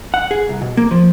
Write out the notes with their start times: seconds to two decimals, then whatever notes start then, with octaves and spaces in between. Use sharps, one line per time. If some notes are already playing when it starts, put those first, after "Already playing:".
0.14 F#5
0.31 G#4
0.49 C2
0.62 B2
0.77 A#3
0.91 F3